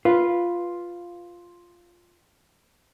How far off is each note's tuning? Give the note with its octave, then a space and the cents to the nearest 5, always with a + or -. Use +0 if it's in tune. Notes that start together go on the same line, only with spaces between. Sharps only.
F4 +0 B4 -5